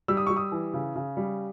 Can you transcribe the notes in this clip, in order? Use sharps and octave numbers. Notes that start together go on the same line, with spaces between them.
G3 E6
D#6
G3 C#6
D#6
E3
C#3
C#3
G3